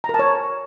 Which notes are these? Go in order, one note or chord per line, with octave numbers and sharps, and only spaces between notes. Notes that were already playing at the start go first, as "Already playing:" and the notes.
A#5
A#4
A5
C#5